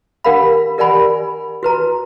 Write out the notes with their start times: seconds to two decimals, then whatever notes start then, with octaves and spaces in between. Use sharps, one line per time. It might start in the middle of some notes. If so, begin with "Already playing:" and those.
0.24 D4 G4 A#4 F5 F#5 B5
0.78 G4 A#4 D5 F#5 G#5 B5
1.63 F#4 B4 A#5